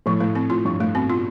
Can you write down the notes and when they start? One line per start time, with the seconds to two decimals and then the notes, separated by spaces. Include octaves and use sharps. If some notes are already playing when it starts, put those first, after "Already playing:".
0.06 A2 F3
0.20 A2 A3
0.35 C4
0.50 A2 F4
0.65 G2 F3
0.80 A2 A3
0.95 B2 C4
1.10 B2 F4